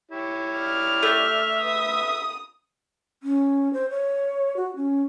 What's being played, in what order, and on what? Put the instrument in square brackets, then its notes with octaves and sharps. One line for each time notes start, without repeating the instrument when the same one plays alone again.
[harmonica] E4 G4 C#5
[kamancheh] D5 F6
[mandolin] A3 [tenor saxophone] E5
[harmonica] B4 [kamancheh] D#6
[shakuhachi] C#4
C5
C#5
F#4
C#4